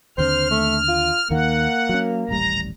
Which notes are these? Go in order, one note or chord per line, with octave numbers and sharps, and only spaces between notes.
D#2 D3 C4 C5 F6
A3
F4
D#2 D#3 A#3 F#5
F#3 C#4
D#1 A1 G3 A#5